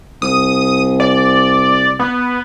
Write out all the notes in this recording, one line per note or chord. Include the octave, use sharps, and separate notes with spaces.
C2 D#6
D5
B3